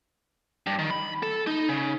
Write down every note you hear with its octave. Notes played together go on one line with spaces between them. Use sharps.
G2
D#3
B5
A4
D#4
C#3